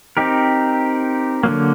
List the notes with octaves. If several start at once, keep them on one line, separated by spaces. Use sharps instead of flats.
C4 D#4 G4 A#4
D3 F#3 A#3